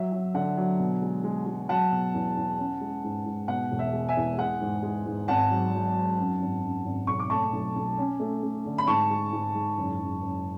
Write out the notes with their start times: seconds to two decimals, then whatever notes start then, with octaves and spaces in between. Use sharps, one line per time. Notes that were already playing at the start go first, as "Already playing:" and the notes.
Already playing: F#3 E5
0.12 F#3
0.34 D3 F#5
0.57 F#3
0.79 B2
1.02 G#3
1.24 G#3
1.46 G#3
1.69 F#3 F#5 A5
1.92 B2
2.14 E2
2.37 E2
2.59 C#4
2.81 G#3
3.04 G#2
3.26 G#2
3.48 B2 F#5
3.72 E1
3.79 E5
3.93 G#3
4.09 E5 G#5
4.17 E2
4.38 G#3 F#5
4.61 G#2
4.83 G#3
5.06 G#2
5.28 G#1 F#5 A5
5.51 F#3
5.74 F#3
5.95 F#3
6.18 F#2
6.41 G#1
6.62 F#2
6.85 G#1
7.07 B1 C#6
7.19 D6
7.30 A3 A5 C#6
7.53 B1
7.76 B1
7.98 C#4
8.20 A3
8.43 A3
8.65 D3
8.78 B5
8.87 G#2 A5 C#6
9.10 G#3
9.33 G#2
9.55 G#2
9.78 F#1
10.00 F#1
10.22 F#1